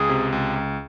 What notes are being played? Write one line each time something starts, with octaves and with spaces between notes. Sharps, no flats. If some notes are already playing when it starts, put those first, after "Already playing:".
Already playing: C#2 G#4
C3
C#2
C#2